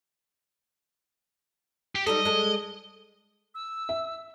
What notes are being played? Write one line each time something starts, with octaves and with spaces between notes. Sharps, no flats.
G4
G3 D#4 A4 D#5
G#3 A4
E6
E5